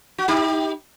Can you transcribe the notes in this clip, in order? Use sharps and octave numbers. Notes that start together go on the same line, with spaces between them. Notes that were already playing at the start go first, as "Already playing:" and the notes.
F#4
D#4 G4